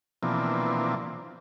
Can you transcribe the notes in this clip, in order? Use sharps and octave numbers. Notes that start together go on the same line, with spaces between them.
B2 E3 F3 A#3 C4 D4